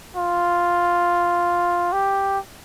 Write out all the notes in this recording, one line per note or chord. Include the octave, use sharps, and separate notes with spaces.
F4
G4